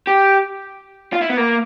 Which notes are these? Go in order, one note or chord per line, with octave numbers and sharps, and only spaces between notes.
G4
F4
E4
B3
A#3